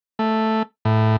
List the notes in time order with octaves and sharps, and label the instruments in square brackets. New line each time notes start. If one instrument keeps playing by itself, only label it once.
[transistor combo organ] A3
A2